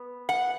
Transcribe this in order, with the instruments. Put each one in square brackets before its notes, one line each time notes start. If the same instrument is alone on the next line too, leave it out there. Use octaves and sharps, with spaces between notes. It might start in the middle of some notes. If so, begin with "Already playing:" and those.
Already playing: [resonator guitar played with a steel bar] B3
F#5